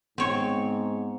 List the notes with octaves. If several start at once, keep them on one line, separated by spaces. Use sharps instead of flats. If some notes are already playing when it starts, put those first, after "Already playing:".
G#2 B3 C4 C#5